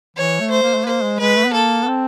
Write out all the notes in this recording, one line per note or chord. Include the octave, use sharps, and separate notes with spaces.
E3 C#5
A3
C5
A#3
A3
A#3 C5
G#3
G#3 B4
A3
B3
A#3 A4
B3
C4